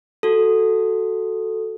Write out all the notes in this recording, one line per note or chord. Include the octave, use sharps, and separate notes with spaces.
F#4 A4